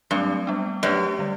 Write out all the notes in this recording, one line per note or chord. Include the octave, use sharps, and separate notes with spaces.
G2 F#3 A3 C4
G3 B3 D4
F#2 A3 D4 G4 B4 D5
D3 G3